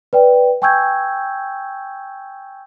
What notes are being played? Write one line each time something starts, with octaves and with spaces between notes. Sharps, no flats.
B4 D5 G5
G5 G#5 C#6 E6 G6 G#6